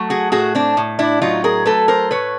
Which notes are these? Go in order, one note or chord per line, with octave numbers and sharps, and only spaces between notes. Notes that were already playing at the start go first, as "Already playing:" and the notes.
Already playing: F#3 A3
F#4 G#4
A2 F#4 G#4
C4 D4
A2
D4 E4
F#3 D#4 F4
G#4 A#4
A3 A4 B4
A#4 C5
A2 B4 C#5